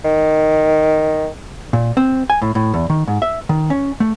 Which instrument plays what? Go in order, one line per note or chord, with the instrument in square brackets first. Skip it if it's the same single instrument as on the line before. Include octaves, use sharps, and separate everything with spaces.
[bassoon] D#3
[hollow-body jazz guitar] A#2
C4
G#5
A2
A2
E2
D#3
G#2
E5
D#3
C#4
A3